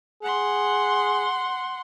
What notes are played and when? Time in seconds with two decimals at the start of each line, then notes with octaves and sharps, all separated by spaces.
0.23 G#4 F#5 C6